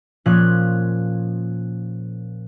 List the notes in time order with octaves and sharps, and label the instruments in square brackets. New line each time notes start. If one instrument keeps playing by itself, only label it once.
[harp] A#2 F3 C#4 F#6